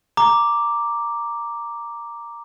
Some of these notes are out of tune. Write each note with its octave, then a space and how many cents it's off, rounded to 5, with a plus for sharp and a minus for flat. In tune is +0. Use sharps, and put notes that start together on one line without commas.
A#5 +0 D6 +0